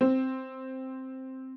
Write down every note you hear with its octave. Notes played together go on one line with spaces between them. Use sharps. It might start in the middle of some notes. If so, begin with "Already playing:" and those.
C4